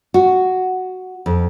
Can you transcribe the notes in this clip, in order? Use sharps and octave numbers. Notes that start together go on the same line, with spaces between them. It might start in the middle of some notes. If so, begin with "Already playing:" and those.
F#4
F2